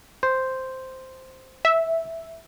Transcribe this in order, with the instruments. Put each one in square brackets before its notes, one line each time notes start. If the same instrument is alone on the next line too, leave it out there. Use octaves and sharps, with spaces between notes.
[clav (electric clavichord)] C5
[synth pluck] E5